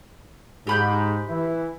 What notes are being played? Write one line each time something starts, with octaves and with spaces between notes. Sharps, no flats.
G#2 G4 B5 G6
E3 E4